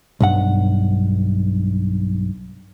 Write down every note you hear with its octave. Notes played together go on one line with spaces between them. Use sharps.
B1 G2 F#5